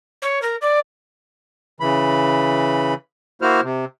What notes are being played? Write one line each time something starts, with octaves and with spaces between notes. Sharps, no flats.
C#5
A#4
D5
C#3 E3 B5
A#3 E4 F#4 C5 F6
C3